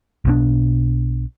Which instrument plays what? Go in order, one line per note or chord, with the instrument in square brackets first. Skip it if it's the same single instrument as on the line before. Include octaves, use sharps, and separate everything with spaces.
[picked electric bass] B1 B2 D4